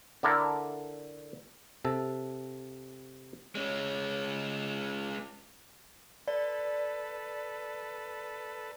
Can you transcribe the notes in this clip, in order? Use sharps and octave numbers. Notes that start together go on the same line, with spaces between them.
D3 D4 E4 A4 A#4
C3 A4
G#3 C#4
A4 B4 D5